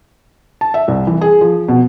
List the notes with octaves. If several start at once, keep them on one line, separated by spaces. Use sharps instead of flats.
A5
E5
C2
E3
G#4
F3
B2